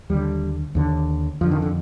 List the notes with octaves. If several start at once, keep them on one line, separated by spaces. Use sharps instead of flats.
D#2 D3 G3
D#2 D3
F2 D3 F3
D#3
D3